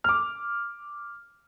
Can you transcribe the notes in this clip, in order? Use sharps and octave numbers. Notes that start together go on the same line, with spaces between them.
D6 F6